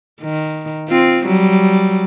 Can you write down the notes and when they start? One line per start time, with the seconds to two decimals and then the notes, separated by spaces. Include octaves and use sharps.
0.21 D#3
0.88 C4 F4
1.26 F#3 G3